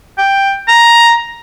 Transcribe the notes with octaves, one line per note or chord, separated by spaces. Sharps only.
G5
A#5